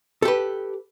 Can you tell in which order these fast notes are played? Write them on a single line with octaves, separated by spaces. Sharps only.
A4 G4 B4